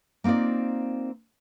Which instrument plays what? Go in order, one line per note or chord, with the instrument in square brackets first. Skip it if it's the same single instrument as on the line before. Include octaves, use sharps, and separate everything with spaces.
[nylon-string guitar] A#3 C4 D#4 F4 D5